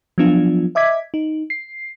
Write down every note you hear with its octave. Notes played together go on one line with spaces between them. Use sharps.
F3 F#3 B3 D4 F4
D#5 E5 D6 G#6 B6
D#4
C7